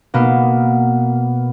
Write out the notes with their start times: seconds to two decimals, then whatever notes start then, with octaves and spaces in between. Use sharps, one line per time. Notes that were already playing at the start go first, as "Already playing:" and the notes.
0.14 B2 A#3 B3